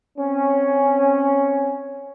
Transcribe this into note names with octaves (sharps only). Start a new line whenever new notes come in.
C4 C#4